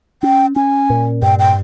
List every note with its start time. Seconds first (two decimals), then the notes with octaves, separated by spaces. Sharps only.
0.23 C#4 G5
0.56 C#4 G#5
0.90 A#2
1.22 G2 G5
1.39 G5